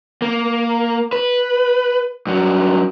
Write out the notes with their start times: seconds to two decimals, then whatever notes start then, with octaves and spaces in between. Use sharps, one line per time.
0.22 A#3
1.13 B4
2.27 G2 F#3